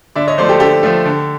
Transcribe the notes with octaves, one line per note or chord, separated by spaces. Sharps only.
D3 D5 E5
C#5 D#5
F3 A3 C5 D5
G4 A4
D3 G4 A4
F3 A3
D3